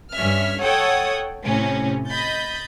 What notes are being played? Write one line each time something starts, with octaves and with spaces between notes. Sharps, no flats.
G2 C#4 E5 F6
A4 C#5 F#5 G5 D#6
A2 C3 C#4
D#5 B5 G6 A6